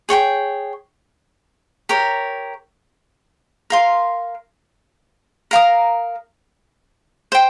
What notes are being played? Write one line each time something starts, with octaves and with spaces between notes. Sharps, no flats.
G#4 C#5 G5 C#6
G4 A#4 C#5
A#4 F5 C6
A#4 F5 A#5 D#6
C5 G5